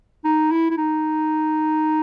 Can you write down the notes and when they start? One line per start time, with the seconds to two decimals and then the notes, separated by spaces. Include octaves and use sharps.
0.24 D#4
0.51 E4
0.70 E4
0.78 D#4